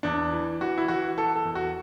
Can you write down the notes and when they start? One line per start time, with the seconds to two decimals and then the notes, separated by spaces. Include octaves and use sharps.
0.03 E2 D4
0.33 E3
0.61 E3 F#4
0.78 E4
0.88 E3 F#4
1.17 E3 A4
1.36 A4
1.45 E2
1.55 F#4